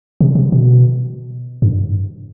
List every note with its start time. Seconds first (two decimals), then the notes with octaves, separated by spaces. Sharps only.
0.21 C3
0.35 C3
0.52 B2
1.62 G2